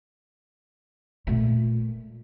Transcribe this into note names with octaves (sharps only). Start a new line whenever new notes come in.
A#2 A3